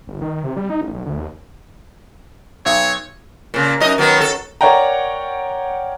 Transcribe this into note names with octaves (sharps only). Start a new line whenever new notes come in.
G1
D#3
C3
G3
D#4
A1
B1
D2
D#2
B1 C#5
A#2 C#3
F#2 D#4 D#5
D#3 F#3 B3
A4
A#4 C#5 D5 F#5 G5 A#5